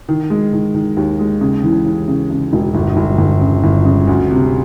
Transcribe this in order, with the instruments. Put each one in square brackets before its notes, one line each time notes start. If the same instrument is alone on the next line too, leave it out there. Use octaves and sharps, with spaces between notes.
[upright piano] D#3
G#3
D#3
D#3
D#2
G#3
C#3
E3
E3
C#3
C#3
E1
G1
G1
G1
C#3
G1
C#3
D2
C3